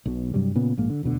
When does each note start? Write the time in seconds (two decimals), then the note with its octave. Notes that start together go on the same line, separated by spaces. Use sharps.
0.06 B1 B2
0.34 G2 C3 F#3 G3
0.55 A#2 C#3 B3
0.77 A#1 G#2 A#3
0.90 D3
1.03 E1 D2 B2 D3